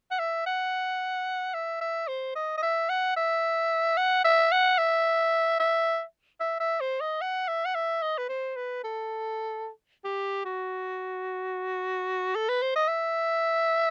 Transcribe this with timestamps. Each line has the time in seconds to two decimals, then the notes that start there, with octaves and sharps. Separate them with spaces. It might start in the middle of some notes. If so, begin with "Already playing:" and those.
0.11 F#5
0.19 E5
0.46 F#5
1.54 E5
1.81 E5
2.08 C5
2.36 D#5
2.57 D#5
2.63 E5
2.89 F#5
3.17 E5
3.97 F#5
4.25 E5
4.52 F#5
4.78 E5
5.60 E5
6.40 E5
6.60 E5
6.81 C5
7.01 D#5
7.21 F#5
7.48 E5
7.65 F#5
7.75 E5
8.02 D#5
8.18 B4
8.29 C5
8.56 B4
8.84 A4
10.04 G4
10.45 F#4
12.35 A4
12.49 B4
12.62 C5
12.75 D#5
12.88 E5